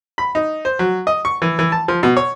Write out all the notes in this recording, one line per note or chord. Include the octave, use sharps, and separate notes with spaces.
B5
D#4
C5
F#3
D#5
C#6
E3
E3
A5
F3
B2
C#5